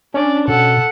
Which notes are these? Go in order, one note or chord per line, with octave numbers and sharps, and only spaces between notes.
C#4 D4 D5
B2 A4 F#5